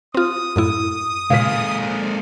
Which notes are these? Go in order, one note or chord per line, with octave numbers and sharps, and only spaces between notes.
C4 F4 D#6
F#2 A2 E4
A#2 C#3 G#3 A#3 F5 B6
D4 E4 C5